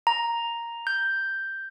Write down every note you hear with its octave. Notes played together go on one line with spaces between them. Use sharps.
A#5
G6